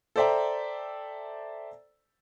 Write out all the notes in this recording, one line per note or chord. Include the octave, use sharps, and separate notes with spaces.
A4 C5 D5 E5 G5 A#5